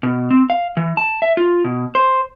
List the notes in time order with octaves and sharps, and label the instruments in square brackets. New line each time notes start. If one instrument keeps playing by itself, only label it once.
[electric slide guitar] B2
C4
F5
E3
A5
E5
F4
B2
C5